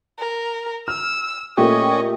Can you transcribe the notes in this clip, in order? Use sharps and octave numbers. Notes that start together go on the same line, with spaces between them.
A#4
E6 F6
A#2 A3 C#4 G4 D#5